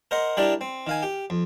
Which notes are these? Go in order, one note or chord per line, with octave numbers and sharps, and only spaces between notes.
A#4 C5 D#5 F#5
G3 D4 E4 G4 A#4 D5
C4
D#3 F5 G#5
G4
F2